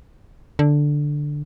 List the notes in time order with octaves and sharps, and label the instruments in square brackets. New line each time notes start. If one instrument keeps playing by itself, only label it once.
[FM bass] D3